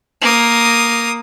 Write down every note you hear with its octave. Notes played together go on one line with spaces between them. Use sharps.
A#3 D#6